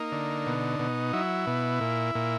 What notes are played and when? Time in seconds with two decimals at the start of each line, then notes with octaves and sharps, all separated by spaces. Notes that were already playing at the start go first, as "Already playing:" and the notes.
Already playing: A#3 D#4
0.12 D3
0.46 B2
0.79 B2
1.13 F#3 E4
1.47 B2
1.81 A#2
2.15 A#2